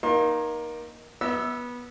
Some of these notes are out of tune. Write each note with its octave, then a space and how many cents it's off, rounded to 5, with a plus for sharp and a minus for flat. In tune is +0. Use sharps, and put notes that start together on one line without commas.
A#3 +25 D#4 +0 C6 +40
B3 -20 E5 -35 E6 +10